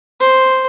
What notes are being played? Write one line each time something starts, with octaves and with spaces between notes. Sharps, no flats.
C5